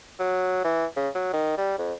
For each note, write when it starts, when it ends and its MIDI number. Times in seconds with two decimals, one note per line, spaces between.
0.19 0.61 54
0.65 0.86 52
0.96 1.09 49
1.15 1.30 54
1.33 1.57 51
1.58 1.77 55
1.78 1.93 41